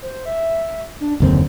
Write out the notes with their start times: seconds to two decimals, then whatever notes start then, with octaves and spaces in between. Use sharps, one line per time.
0.02 C5
0.26 E5
1.00 D4
1.20 F#1 D#2 D3 C4